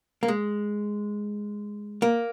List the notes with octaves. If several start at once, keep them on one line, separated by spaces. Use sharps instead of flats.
A#3
G#3
A#3